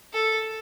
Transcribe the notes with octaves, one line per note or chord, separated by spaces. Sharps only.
A4